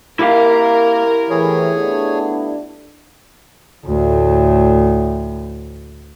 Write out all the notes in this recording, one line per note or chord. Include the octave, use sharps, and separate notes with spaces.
A#3 E4 G4 A#4 F5
A2 E3 G#4 C#5
A3 B3 D4
D2 A2